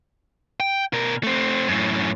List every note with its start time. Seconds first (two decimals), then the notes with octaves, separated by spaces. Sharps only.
0.60 G5
0.93 B2 A#4
1.23 A3 C4
1.68 F#2 A2